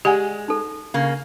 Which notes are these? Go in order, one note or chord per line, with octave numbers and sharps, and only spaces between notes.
G#3 G4 D5 F#5 G#5
D#4 A4
C#3 A#3